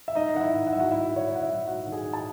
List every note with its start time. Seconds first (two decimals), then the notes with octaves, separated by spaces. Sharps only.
0.08 E5
0.15 G#2 D#4 D#5
0.34 D#3 F#5
0.41 E4 E5
0.53 G#2
0.67 F#5
0.73 F#3 E5
0.80 F#4 F#5
0.91 G#2 E4 E5
1.11 D#3
1.16 C#5
1.29 G#2
1.35 F#5
1.43 E4 E5
1.49 F#3
1.67 G#2 F#4 F#5
1.86 D#3
1.92 G#4 G#5
2.06 G#2
2.13 A5